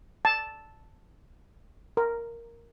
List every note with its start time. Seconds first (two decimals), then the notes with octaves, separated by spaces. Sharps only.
0.25 A5
1.97 A#4